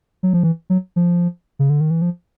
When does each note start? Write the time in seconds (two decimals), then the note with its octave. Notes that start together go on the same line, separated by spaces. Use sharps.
0.23 F#3
0.33 F3
0.43 E3
0.70 F#3
0.96 F3
1.59 C#3
1.70 D3
1.81 D#3
1.91 E3
2.02 F3